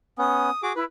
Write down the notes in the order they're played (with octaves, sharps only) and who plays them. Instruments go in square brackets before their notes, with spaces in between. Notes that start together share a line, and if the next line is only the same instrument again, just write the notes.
[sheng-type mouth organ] B3 C#4 [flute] D#6
[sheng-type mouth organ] F#4 G#4 D6
[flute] E4 [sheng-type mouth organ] B4